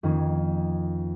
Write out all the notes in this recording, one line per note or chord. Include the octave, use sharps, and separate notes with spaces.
F2 D#3 A#3 C#4